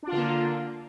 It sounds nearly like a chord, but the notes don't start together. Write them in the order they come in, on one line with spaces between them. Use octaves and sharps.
D4 F4 D3 A#3